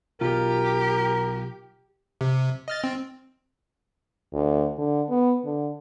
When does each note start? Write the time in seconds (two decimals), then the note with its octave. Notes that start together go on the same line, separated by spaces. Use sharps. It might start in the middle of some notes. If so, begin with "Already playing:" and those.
0.21 B1 F4 G4 A#4
2.21 C3
2.68 D#5 F6 A6
2.84 C4
4.33 D2
4.78 D3
5.10 B3
5.45 D3